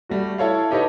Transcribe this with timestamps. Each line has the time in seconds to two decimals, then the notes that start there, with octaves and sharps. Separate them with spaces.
0.09 G3 A3 F#4
0.38 E4 A4 C#5 F5
0.71 D#4 G4 A4 B4 C#5 D#5